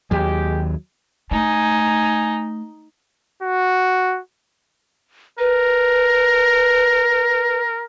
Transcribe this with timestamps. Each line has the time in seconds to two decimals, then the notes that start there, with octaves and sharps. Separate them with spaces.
0.11 D#2 F#3 G#3 G4
1.31 A3 D#4 G#5
3.43 F#4
5.39 A#4 B4